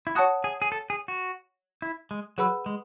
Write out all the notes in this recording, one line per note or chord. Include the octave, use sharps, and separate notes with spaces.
E4
F#4 C#5 F#5 A5 D#6 F#6
G#4
G#4
A4
G#4
F#4
E4
G#3
F#3 G#4 B4 F#5 B5 E6
G#3